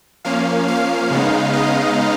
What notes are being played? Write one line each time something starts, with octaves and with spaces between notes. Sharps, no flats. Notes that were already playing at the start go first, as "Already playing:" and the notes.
F3 A#3 C#4 F5
F5
C#3 G#3 B3 D#4
D#5